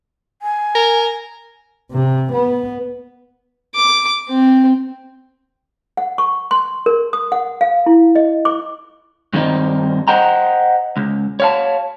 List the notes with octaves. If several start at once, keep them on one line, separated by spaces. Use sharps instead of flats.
G#5
A#4
C3
B3
D6
C4
F#5
C#6
C6
A#4
D#6
F#5
F5
E4
D#5
D6
G2 D#3 G3 C4 D#4
C5 D#5 F#5 G5 A#5
C#2
C#5 F5 A5